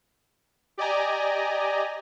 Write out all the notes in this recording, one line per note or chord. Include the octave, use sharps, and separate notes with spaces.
G4 D5 D#5 G#5 A#5